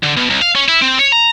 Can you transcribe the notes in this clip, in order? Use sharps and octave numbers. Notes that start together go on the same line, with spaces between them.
D3
B2
C2
F5
C#4
E4
C4
C#5
A#5